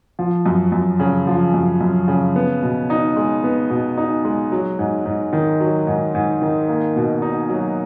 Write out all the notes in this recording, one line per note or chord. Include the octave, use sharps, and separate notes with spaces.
F3
F#2
F#2
C#3
F3
F#2
F#2
C#3
B3
B2
D#4
G#3
B3
B2
D#4
G#3
F#3
G#2
G#2
D#3
F#3
G#2
G#2
D#3
A#3
B2
D#4
F#3